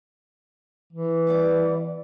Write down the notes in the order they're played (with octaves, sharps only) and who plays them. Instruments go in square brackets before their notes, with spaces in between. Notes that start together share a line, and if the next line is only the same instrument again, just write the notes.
[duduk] E3
[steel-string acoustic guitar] G3 B3 D5